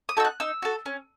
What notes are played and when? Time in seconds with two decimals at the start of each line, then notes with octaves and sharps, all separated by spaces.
0.09 D#6
0.17 D#4 F#4 A4 E6
0.25 F#6
0.40 D#4 E6
0.62 F#4 A4
0.86 C#4